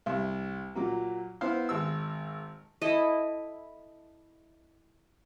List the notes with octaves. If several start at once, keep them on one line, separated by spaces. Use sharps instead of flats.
C2
A#2 F#3 A#3
B3 E4 C5 F5
G#1 E6
E4 A4 D#5